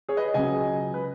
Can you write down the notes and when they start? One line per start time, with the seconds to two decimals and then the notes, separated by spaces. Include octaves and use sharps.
0.09 G#4 C#5
0.17 B4 D#5
0.34 C#2 C#3 F#3 D#5 G#5
0.94 B4